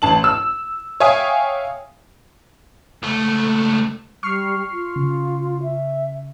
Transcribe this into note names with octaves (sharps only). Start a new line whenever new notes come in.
A1 A5 F#7
E6
C#5 E5 F5 G5 G#5 D#6
C#2 A3
G3 C#6 F6 C7
F4
C#3
E5